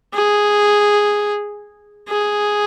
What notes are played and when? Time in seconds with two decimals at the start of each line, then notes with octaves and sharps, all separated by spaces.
0.14 G#4
2.09 G#4